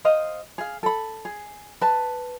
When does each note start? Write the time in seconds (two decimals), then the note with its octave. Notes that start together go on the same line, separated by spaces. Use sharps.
0.05 C5 D#5 F5
0.58 G#4 F5
0.83 A4 B5
1.25 G#4
1.81 B4 A5